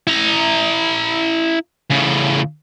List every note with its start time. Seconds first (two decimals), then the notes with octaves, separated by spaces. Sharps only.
0.07 E4 A#5
1.91 A2 C#3